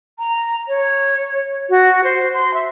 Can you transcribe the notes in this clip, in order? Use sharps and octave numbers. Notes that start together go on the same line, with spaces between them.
A#5
C#5
F#4
C5
C6
E5